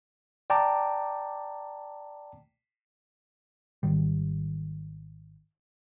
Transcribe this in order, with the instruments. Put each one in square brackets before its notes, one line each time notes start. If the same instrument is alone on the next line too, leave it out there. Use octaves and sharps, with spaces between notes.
[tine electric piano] D5 G5 A5 A#5 D6
[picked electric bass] G#1 D#3 G3